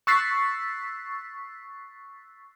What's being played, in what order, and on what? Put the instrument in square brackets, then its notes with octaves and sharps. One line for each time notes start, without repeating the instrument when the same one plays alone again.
[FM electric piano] C#6 E6 F#6 A6 B6 C7